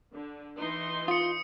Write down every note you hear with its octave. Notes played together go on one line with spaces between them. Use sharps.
D3
E3 D#4 C6
F4 D#6 C#7